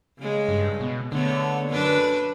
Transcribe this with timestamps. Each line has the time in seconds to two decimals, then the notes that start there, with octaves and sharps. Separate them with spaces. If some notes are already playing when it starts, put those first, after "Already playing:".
0.19 C#3 G#3
0.49 G2
0.81 B2
1.12 D3 A3 B3 C#5
1.69 F#2 D4 B4